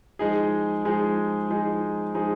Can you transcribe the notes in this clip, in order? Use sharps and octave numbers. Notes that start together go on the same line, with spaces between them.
F3 G#3 D#4 G#4
F3 G#3 D#4 G#4
F3 G#3 D#4 G#4
F3 G#3 D#4 G#4